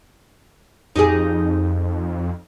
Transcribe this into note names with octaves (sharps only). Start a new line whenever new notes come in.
F2 D#4 G4 G#4